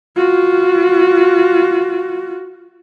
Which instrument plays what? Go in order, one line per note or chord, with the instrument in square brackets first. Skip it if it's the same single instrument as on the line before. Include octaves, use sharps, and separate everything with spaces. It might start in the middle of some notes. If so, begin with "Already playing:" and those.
[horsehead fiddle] F4 F#4